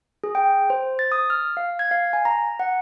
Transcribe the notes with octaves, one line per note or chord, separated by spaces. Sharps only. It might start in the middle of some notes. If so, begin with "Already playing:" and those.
G#4
G5
C5
A6
D#6
F6
F5
G#6
F5
G#5
A#5
F#5